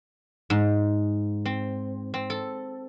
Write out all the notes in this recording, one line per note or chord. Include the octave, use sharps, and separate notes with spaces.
G#2
C4
C4
A4